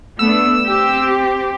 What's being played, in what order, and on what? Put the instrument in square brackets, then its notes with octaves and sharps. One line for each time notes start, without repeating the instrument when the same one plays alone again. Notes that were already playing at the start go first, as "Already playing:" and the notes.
[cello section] A3 B3 D4 [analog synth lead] E6
[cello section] C4 G4